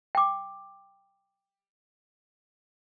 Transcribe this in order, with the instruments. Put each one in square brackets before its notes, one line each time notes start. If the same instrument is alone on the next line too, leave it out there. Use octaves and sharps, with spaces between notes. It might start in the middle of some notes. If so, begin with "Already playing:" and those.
[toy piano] G5 D6